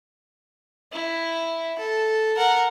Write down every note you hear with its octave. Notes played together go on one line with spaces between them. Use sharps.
E4
A4
A#4 F#5